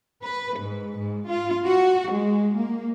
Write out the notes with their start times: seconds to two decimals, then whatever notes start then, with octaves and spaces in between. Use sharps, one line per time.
0.22 B4
0.58 G#2
0.98 G#2
1.28 F4
1.66 F#4
2.11 G#3
2.56 A#3